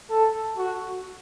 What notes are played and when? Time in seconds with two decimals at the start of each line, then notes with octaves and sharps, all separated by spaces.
0.10 A4
0.57 F#4